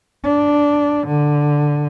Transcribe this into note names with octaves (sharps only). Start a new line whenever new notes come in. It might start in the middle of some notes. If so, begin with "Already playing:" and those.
D4
D3